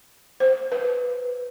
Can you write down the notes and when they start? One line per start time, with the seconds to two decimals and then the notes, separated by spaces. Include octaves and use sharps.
0.40 C5
0.72 B4